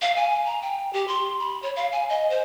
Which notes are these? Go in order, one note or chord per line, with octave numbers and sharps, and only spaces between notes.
F5
G#5
A#5
G5
G4
C6
B5
C#5
F5
G#5
D#5
C5